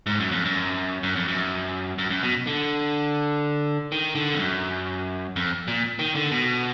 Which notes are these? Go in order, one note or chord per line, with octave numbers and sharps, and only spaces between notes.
G#2
F#2
F2
F#2
F#2
F2
F#2
F#2
F#2
B2
D3
D#3
D3
F2
F#2
F2
A#2
D#3
D3
B2